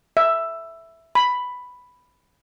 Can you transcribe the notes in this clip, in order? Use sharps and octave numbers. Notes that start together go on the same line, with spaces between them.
E5
B5